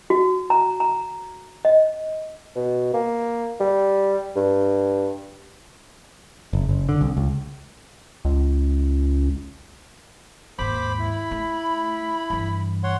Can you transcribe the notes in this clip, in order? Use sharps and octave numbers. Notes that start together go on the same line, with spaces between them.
F#4
A#5
A#5
D#5
B2
A#3
G3
G2
F#1
F#1
D3
C2
C#2
C#2
D#2 G#2 C5 B5 D6
E4
A3
G2 E3
C#5 F#5 C6